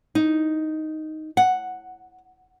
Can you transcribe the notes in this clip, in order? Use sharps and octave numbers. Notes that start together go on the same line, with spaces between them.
D#4
F#5